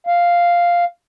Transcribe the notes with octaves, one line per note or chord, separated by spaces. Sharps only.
F5